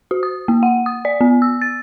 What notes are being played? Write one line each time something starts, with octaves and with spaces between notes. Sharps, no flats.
F#4
D#6
A#3
F#5
D#6
D5
B3
E6
A6